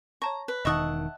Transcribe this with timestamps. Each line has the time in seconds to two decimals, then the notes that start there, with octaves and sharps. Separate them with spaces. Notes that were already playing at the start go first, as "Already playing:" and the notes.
0.22 C#5 A5 A#5 C#6
0.48 B4
0.65 E1 D#3 D#5 E5 F#5 A5 C#6 D#6